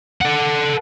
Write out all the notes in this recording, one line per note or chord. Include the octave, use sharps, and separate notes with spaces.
A4 F#5